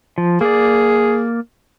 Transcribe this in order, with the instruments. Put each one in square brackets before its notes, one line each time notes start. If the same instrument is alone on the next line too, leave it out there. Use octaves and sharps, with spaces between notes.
[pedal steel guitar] F3
[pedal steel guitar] A#3 D5 [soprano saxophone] G#4